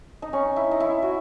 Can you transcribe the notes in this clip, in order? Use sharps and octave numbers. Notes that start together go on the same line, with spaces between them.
D#4
C#4
E4
D#4
E4
F#4